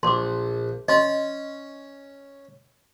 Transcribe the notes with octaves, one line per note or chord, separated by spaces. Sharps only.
A#1 C6 D6
C#4 D#5 C6